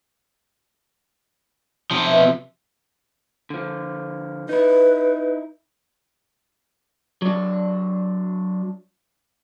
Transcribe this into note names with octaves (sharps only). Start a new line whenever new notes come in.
C3 F3
B2 E5
D3 F3
D#4 E4 B4
F#3 D4